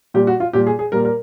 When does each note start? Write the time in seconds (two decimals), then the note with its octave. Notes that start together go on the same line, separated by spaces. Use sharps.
0.14 A#2 G3 G4
0.27 F#4
0.40 F4
0.53 A#2 G3 G4
0.67 G#4
0.79 G#4
0.92 A#2 G3 A#4
1.05 A#4